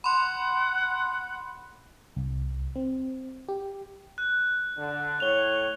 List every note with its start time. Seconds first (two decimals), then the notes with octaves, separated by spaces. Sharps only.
0.04 F#5 B5 C6
2.16 C2
2.75 C4
3.48 G4
4.18 F#6
4.77 D3
5.20 A2 C#5 F7 G7